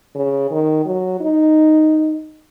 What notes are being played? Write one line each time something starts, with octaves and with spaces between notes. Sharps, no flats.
C#3
D#3
F#3
D#4